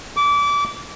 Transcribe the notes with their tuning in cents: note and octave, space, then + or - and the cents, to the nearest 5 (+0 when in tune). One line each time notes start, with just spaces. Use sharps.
D6 -25